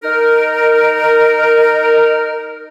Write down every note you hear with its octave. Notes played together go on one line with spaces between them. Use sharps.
D#4 A#4